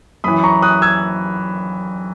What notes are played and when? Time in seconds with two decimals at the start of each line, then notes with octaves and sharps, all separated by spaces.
0.24 F#2 E3 B5 D#6
0.44 A#5 C#6
0.62 D#6 F#6
0.82 E6 G#6